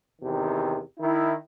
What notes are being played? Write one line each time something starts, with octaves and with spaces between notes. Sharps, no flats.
E2 C3 D#3
D#3 E4